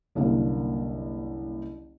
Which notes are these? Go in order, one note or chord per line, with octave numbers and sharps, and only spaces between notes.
F#1 C2 D3 A#3